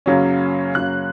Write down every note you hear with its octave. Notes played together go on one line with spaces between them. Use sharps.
F#2 C#3 F#3 A#3 C#4
F#2 C#3 F#3 A#3 C#4 F#6